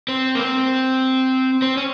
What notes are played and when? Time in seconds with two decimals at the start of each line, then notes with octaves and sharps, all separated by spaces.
0.08 C4
0.35 A#3
0.39 C4
1.62 C4
1.77 C#4